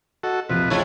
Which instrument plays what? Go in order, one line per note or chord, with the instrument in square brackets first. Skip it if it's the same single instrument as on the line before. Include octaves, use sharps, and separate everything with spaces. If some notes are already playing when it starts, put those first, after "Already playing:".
[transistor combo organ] F#4 A4 [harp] D#5
[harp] E1 A#1 A6 [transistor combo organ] C3 F3 [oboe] B4
[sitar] F2 E4 F4 [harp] A3 G#4 C#6 [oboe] C#5